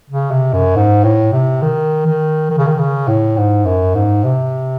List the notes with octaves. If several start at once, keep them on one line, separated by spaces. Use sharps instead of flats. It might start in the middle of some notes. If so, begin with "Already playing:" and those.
C#3
C3
F#2
G#2
A2
C3
D#3
D#3
D#3
C#3
D#3
C#3
A2
G#2
F#2
G#2
C3